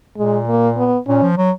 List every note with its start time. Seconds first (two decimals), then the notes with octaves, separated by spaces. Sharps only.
0.17 A#2 G#3
0.47 A#3
0.77 B3
1.07 A#2 C#4
1.22 F3
1.38 F#3